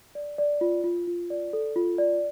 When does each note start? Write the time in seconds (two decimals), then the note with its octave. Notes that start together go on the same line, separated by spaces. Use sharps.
0.15 D5
0.38 D5
0.61 F4
0.84 F4
1.07 F4
1.30 D5
1.53 A4
1.76 F4
1.98 D5